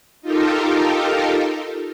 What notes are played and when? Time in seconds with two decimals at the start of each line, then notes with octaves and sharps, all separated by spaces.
0.21 D#4 F4 G4 A4 A#4